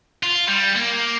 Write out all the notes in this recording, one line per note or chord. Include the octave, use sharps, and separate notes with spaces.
F4
G3
A#3